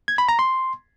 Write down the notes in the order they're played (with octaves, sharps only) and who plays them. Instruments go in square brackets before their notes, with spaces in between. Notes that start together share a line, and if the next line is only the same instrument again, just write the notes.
[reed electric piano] G#6
B5
A#5
C6